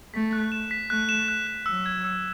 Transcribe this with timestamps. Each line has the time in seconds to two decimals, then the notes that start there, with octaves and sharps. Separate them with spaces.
0.14 A3 B6
0.33 F#6
0.52 E7
0.71 B6
0.90 A3 F#6
1.09 E7
1.28 F#6
1.47 F#6
1.66 F#3 E6
1.86 G#6
2.04 E6